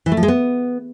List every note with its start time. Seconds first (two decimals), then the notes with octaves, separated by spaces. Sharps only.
0.06 E3
0.12 A3
0.17 F3
0.23 G#3
0.28 B3